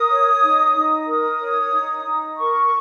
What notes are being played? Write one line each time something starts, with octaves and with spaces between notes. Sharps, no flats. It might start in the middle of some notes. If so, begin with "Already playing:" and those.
Already playing: A#4 D#6
C#5
D#4
D#4
A#4 D#6
C#5
D#4
D#4
A#4 C#6